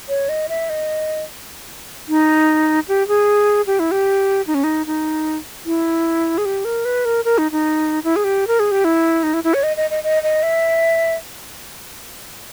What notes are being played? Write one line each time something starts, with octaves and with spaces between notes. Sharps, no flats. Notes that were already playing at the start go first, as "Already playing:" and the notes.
C#5
D#5
E5
D#5
D#4
G4
G#4
G4
E4
G4
D#4
C#4
D#4
D#4
E4
G#4
G4
A#4
B4
A#4
A#4
D#4
D#4
E4
G#4
G4
A#4
G#4
G4
E4
D#4
E4
E4
C#5
D#5
D#5
D#5
D#5
D#5
E5